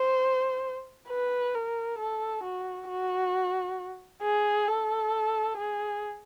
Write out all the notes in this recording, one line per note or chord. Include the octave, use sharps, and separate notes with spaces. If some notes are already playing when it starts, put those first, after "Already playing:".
Already playing: C5
B4
A#4
A4
F#4
F#4
G#4
A4
G#4